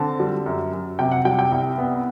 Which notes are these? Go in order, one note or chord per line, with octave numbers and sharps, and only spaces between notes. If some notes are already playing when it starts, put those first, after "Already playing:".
Already playing: D3 C4 A5
G3
F#2
F#2
C3 G5
F#5
G3 G5
G5
C2
B3